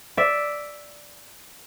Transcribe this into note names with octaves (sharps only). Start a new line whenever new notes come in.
D5 E5